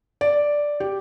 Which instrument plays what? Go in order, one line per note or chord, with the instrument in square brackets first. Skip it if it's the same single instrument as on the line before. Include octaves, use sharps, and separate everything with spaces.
[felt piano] D5
G4